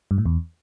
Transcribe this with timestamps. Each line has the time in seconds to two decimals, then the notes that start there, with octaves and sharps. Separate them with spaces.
0.11 G2
0.18 A2
0.26 E2